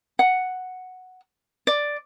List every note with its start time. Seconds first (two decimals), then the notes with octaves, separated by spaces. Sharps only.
0.19 F#5
1.67 D5